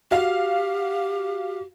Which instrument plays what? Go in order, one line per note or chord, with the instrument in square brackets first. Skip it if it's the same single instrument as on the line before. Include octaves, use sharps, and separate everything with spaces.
[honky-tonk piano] F#4 F5 [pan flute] G4